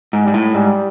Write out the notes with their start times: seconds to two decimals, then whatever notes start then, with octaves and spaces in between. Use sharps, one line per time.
0.13 G#2
0.24 G#2 G3
0.34 A2
0.54 G#2 G3